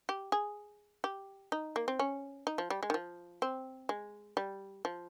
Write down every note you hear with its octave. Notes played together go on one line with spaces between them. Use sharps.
G4
G#4
G4
D#4
A#3
C4
C#4
D#4
F3
G3
G#3
D#3
F3
C4
G#3
G3
F3